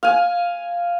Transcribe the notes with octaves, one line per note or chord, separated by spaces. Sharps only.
F5 G#5